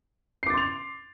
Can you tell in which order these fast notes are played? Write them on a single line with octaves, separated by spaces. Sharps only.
C7 D6 A6 C6 F7